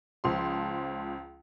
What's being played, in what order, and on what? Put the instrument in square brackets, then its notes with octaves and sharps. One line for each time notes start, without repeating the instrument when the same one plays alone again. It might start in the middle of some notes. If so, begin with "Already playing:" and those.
[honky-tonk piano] C#2 F3 C6